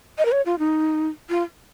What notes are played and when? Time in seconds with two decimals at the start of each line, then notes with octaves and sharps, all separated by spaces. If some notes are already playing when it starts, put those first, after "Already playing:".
0.18 D#5
0.25 A#4
0.32 C#5
0.46 F4
0.59 D#4
1.29 F4